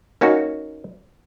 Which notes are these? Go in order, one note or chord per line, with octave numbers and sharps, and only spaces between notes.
A#3 C#4 D#4 F#4